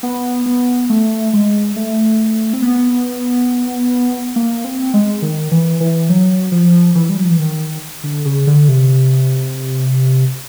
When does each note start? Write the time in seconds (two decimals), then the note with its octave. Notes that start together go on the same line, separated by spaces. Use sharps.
0.03 B3
0.46 B3
0.90 A3
1.33 G#3
1.76 A3
2.53 C4
2.62 B3
4.36 A#3
4.64 C4
4.94 G#3
5.22 D#3
5.52 E3
5.80 E3
6.09 F#3
6.52 F3
6.95 E3
7.09 G3
7.17 F#3
7.24 F3
7.31 E3
7.39 D#3
8.04 D3
8.25 C#3
8.47 D3
8.69 C3